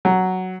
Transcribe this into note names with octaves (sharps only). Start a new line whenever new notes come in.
F#3